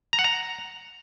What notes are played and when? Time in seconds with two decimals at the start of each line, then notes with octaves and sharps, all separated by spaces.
0.13 A#5
0.19 F#5
0.24 A#5